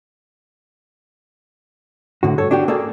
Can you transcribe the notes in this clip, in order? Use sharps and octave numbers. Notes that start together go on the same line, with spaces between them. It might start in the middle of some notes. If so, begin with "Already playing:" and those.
A2 D3 F#4
G2 A4 C#5
D4 F#4 G4
A#3 G#4 A4 D5